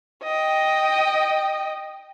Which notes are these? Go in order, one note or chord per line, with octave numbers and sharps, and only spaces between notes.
D#5 G5